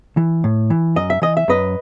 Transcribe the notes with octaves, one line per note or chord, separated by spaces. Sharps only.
E3
A2
E3
F#2 D#5
E5
E3 D#5
E5
F#2 B4 D#5